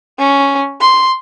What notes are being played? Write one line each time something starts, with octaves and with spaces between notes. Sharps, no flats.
C#4
C6